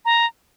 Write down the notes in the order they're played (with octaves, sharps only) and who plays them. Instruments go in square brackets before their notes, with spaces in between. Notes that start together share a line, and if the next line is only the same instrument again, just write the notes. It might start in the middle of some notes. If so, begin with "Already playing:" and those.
[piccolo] A#5